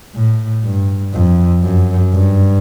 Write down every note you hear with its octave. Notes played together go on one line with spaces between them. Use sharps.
A2
G2
F2
F#2
G2